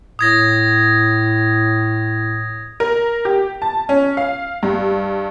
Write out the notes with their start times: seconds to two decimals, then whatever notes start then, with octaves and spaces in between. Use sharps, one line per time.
0.19 A2 D#6 G#6 A#6
2.80 A#4
3.25 G4
3.62 A5
3.89 C#4
4.17 F5
4.63 G2